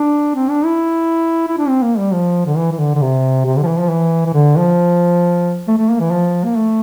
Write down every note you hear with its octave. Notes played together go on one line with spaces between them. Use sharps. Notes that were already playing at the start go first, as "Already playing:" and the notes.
Already playing: D4
C4
D4
E4
E4
D4
C4
A#3
G3
F3
D3
E3
E3
D3
D3
C3
C3
D3
F3
E3
F3
E3
E3
D3
F3
A3
A3
A#3
E3
F3
A#3
A3